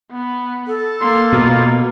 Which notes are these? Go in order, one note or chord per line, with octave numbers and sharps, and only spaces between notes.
B3
A4
A#3 C6
B2 F4